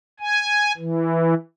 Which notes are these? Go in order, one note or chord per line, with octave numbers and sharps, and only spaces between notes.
G#5
E3